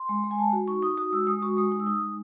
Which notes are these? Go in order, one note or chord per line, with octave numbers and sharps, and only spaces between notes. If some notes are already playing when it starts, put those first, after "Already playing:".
Already playing: C6
G#3
G#3
G#5
G#3 A5
F#4
D#4 C#6
D#4 D#6
F#4 D#6
G#3 E6
G#3 D#6
F#4 C#6
G#3 D#6
D#4 D#6
E6
D#4 D#6
G#3